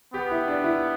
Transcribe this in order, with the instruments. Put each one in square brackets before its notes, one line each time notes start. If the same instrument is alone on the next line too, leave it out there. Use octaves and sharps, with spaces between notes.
[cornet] B3 [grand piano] G4
[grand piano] E4
D4
E4